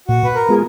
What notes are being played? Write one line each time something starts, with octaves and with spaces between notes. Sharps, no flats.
A#2 F#4
B4
A#4
G#3 B3 F4 G#4